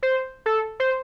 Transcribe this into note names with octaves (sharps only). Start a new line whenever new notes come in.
C5
A4
C5